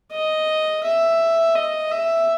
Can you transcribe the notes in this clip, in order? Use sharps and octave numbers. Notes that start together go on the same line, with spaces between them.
D#5
E5
D#5
E5